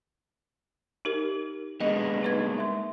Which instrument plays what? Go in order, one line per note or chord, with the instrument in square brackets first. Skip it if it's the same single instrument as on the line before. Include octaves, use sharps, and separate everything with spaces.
[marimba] D#4 G4 A#4
[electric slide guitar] G#3 A#3 B3 [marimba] D4 D#5
[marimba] D#4 B4 G#6
E5 C6